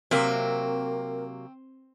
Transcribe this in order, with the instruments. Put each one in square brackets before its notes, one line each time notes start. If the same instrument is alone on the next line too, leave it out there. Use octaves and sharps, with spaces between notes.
[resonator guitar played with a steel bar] C3 F#3 A#3 [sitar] C4 [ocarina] A#4